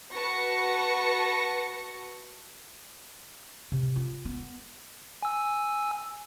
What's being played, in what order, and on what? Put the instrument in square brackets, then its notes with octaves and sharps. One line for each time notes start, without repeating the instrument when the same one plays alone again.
[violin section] F#4 B4 A5 C#6 A#6 C#7
[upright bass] C3
F4
B3
[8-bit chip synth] G#5 E6